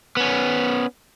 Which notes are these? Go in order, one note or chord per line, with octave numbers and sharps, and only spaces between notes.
B3 C#4